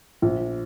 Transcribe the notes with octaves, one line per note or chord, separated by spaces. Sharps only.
A#1